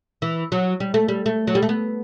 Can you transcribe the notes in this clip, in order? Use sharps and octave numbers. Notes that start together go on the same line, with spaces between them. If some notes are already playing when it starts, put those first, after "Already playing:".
E3
F#3
G3
A3
G3
A3
F#3
G3
A3
B3